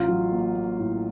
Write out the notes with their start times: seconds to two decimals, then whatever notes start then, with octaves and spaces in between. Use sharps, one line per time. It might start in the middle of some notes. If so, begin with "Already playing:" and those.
Already playing: A1 F4
0.08 F#3
0.32 A#3
0.55 A#3
0.79 A2